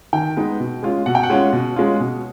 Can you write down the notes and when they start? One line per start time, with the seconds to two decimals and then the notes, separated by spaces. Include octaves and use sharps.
0.13 D#3 G5
0.37 G#3 B3 D#4
0.60 B2
0.83 G#3 C#4 F4
1.06 B2 F#5
1.15 G5
1.23 F#5
1.30 G#3 C#4 F4
1.53 B2
1.76 G#3 C#4 F4
2.00 B2